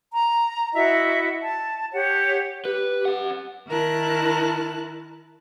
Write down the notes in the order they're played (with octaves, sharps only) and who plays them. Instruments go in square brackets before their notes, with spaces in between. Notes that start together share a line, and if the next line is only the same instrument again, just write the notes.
[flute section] A#5
E4 F#4 D#5 E5
A5
G4 C#5 F#5
[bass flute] G4 [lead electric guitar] B4
[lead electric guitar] C#4 F#5
[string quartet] D#3 E4 A#4 A5 F#6